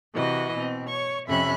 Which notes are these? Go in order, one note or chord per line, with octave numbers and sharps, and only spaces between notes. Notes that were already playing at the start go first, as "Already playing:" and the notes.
C3 E3 F#4 D#5
B2 C4
C#5 C#6
F2 C3 C#4 E5 B5 F#6